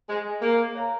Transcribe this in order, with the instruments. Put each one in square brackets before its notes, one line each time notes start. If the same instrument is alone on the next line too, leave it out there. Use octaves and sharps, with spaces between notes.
[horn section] G#3 [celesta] G#4 C5
[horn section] A#3 [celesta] G#4
[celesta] C#5 F5 A#5